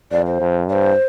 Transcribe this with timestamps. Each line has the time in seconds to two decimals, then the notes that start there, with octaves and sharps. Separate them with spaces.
0.12 F2 D5
0.27 C5
0.40 F2
0.69 G2 D5
0.73 C5